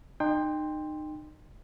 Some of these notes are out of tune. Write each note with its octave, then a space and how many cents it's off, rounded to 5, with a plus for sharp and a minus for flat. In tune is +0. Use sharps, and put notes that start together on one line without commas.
D#4 -30 G5 +20 C6 +0